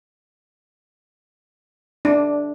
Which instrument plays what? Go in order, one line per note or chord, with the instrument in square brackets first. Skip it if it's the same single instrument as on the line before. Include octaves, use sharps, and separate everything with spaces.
[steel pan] D4